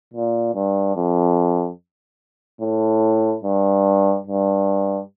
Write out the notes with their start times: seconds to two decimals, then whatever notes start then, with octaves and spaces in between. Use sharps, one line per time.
0.14 A#2
0.55 G2
0.96 F2
2.61 A2
3.43 G2
4.27 G2